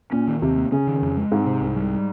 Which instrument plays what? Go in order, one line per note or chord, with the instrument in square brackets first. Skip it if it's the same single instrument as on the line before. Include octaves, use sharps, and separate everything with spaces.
[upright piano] A#2 [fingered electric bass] C#4
[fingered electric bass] D#3
[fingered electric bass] D#2 [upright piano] C3
[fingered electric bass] A#3
[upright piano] C#3 [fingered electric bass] C#4
[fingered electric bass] D#3
F2
G#3
[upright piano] G#2 [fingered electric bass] C4
[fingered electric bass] C3
C2
G3